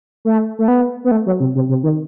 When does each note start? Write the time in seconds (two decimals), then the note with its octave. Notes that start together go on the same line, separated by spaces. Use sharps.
0.25 A3
0.59 A3
0.68 B3
1.04 B3
1.11 A3
1.26 F#3
1.40 C3
1.55 C3
1.69 C3
1.83 D#3